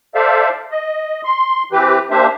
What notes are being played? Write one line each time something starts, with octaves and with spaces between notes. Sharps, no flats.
A4 C5 D5 E5 F5
D#5
C6
E3 C4 G4 B4
A#3 D4 G4 C5 E5